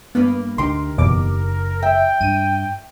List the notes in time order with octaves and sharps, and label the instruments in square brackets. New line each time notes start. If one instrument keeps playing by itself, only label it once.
[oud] G2 A#3 B4 [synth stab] B3
[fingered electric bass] D2 D3 D4 [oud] D#4 G4 [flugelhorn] A#4 [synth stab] C6
[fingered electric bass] F#1 [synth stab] E2 B2 D6
[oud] E5 [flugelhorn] G5
[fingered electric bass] G2 [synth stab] D#7